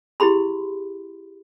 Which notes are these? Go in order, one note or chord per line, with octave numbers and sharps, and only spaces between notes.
E4 G4 G#4 B5 C6